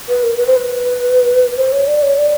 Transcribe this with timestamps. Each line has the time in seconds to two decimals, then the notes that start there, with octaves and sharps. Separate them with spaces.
0.08 B4
0.23 A#4
0.38 B4
0.47 C5
0.56 B4
1.57 C5
1.72 C#5
1.87 D5
2.02 C#5
2.17 D5